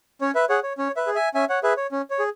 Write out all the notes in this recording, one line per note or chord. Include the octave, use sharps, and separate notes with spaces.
C#4 C#5
B4 E5
G#4 C#5 F#5
C#5
C#4 C#5
B4 E5
G#4
E5 G#5
C#4 E5 G#5
C#5 F#5
G#4 B4 E5
C#5
C#4
C#5
G#4